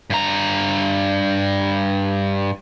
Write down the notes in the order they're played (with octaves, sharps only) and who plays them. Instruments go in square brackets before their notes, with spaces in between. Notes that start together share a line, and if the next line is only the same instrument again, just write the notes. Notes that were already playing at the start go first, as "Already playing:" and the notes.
[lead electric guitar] G2 A#5